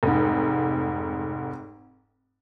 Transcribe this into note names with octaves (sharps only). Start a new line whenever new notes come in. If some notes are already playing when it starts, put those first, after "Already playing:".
F1 G#2